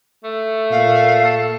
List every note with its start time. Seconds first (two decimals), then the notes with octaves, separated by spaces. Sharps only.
0.24 A3
0.71 A#2 F5
1.25 A4